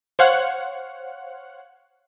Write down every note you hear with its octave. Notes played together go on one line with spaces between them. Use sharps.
C5 C#5 F5 F#5